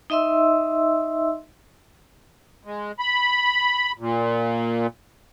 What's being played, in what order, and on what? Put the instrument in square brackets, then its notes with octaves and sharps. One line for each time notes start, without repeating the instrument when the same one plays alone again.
[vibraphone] D#4 D#5 E5 C6 E6
[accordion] G#3
B5
A#2